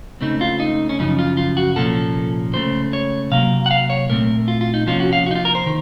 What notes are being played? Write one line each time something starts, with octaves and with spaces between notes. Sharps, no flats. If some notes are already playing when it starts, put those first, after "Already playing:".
C#2 C#3 A3 C4 D#4
F4
D#4
C#4
F#2 C#3 F3 D#4
F4
F4
F#4
C2 A#2 F3 A#3 C#4 A4
C#2 C#3 A3 C5
C#5
C3 F#3 A#3 F5
F#5
F5
C#5
A#2 A3 C4 A#4
F4
F4
D#4
C3 F3 A#3 C#4 F4
F#4
F5
F#4
D#4
F4
A#4
C5
D#3